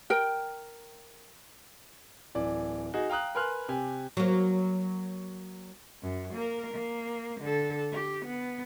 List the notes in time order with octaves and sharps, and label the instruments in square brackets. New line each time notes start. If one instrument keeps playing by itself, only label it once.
[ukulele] A#4 G5
[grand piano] D1 E3 D5
D#4 F#4 G#4
F5 G5 A#5 D#6 F#6
A#4 B4 G#5 C6 F6 F#6
C3 G4 G#5
[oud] F#3 A#3
[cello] F#2
A#3 A#4
A#3
D3 A4
G4
B3